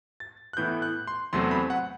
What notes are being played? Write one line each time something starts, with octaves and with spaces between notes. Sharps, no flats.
A6
F#6
A2 E3 B3 E4 G6
F#6
C6
E2 C3 F#3 A3 C4 C6
B5
F#5